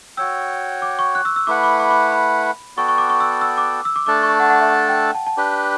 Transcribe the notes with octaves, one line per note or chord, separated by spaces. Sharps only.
F#4 C#5 G5 E6
D6
C#6
F#6
E6
E6
A3 E4 B4 F#5 D6
D6
D6
D6
B5
B3 F#4 A4 D5 G5 C#6
C#6
D6
C#6
E6
E6
D6
E6
D6
A3 D4 A4 D5 D6
C#6
F#5
F#5
E5
F#5
G5
A5
A5
D4 G4 B4